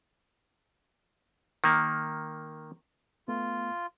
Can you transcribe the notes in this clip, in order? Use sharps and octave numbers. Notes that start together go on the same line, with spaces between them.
D#3 A#3
A3 B3 F4